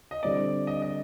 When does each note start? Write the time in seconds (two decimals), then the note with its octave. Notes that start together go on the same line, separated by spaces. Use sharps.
0.11 D#5
0.22 D3 G3 C4 E4 D5
0.67 D#5
0.82 D#5